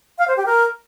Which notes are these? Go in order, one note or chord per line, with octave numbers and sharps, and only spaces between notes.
F5
C5
G4
A#4